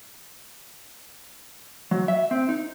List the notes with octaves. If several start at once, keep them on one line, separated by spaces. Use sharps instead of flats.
F#3
E5
C4
D#4